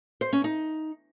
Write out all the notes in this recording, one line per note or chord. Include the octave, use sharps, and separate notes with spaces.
C5
C#4
D#4